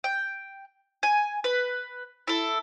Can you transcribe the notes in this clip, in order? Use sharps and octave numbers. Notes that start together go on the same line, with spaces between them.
G5
G#5
B4
E4 A4